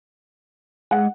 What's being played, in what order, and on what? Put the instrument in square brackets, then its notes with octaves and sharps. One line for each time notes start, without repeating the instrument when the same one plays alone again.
[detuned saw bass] G#3 [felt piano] F#5